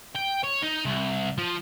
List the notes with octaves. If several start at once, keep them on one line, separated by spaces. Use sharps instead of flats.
G5
C#5
D#4
C2
F3